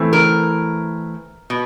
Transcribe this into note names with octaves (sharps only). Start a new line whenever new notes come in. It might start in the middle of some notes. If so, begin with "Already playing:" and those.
Already playing: E3 A3 C4
A#4
B2